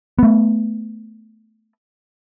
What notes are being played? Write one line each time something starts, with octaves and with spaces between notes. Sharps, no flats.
A3 B3